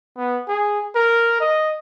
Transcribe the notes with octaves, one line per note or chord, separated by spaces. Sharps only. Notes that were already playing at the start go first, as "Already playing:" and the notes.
B3
G#4
A#4
D#5